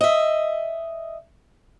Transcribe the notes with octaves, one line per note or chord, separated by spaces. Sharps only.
D#5 E5